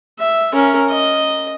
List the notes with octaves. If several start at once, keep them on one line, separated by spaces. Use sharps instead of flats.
E5
C#4 A#4
D#5